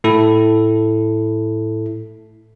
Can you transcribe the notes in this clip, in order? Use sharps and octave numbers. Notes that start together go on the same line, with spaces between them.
A2 E4 A4